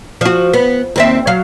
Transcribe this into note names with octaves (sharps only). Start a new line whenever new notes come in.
F3 F#4
B3
D#2 C4 E5
F#3 F5